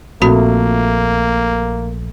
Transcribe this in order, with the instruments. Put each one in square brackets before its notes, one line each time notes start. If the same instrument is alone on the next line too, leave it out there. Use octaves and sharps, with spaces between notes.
[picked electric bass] A#1 [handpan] A#2 A3 [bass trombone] A#3 [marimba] C4 F#4 B5